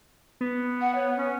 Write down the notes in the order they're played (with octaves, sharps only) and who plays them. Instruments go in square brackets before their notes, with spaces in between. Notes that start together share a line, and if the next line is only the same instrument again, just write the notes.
[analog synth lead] B3
[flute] F#5
C#5
C#4